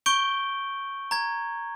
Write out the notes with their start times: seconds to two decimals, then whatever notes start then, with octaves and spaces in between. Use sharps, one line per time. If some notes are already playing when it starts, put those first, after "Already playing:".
0.06 C#6 G6 D7 G7
1.11 A#5 G#6